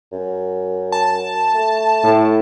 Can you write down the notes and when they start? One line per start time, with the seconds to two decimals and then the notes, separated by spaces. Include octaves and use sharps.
0.12 F#2
0.92 A5
1.54 A3
2.03 A2